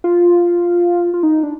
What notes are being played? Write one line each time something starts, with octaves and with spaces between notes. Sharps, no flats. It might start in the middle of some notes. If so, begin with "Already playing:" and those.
F4
F4
D#4
D4